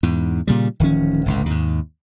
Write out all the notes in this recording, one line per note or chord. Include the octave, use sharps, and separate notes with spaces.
E2 G#2
A#2 C#3 G3
D1 D#3 F3 C#4
G1 C#2 A2
D#2 G#2